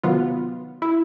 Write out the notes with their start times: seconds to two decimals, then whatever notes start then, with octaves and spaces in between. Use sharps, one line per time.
0.04 C3 D#3 F#3 B3 F4
0.82 E4